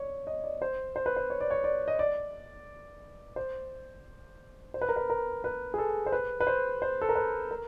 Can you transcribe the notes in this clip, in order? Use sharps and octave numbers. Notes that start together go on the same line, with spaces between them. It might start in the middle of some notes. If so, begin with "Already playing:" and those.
Already playing: C#5 D5
D#5
D5
C5
C5
B4
C5
C#5
D5
C#5
D5
D#5
D5
C5
C5
B4
A#4
B4
A#4
B4
G#4
A4
C5
B4
B4
C5
C5
A4
A#4
B4
A#4